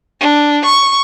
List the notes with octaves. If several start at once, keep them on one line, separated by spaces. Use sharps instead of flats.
D4
C#6